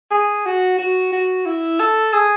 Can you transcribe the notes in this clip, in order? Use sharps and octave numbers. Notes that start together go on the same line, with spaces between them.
G#4
F#4
F#4
F#4
E4
A4
G#4